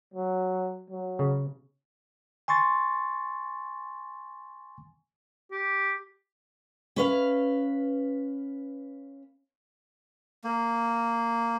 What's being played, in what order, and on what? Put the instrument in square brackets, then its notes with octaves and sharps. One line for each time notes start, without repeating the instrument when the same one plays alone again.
[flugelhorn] F#3
F#3
[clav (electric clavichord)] C#3
[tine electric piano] G#5 C6 C#6 A6
[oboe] G4
[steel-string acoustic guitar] C#4 B4 F5
[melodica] A#3